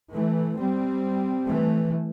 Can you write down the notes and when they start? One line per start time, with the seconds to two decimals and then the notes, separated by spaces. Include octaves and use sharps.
0.13 E3 A3
0.58 G3 C4
1.46 E3 A3